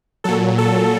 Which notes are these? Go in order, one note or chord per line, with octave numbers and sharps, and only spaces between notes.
A#2 F#3 A4
A4